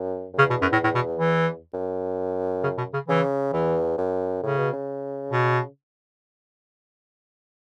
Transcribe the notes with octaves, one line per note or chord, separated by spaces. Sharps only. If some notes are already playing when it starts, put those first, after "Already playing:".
Already playing: F#2
F#2
E2 C#3
B2
F#2
A2
A2
B2
E3
F#2
C#3
B2
C#3
C#3 E3
E2 E3
F#2
A2 C#3
B2
C#3
B2